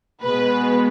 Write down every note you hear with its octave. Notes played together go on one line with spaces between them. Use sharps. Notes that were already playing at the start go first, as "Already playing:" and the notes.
B2 G#3 B3 B4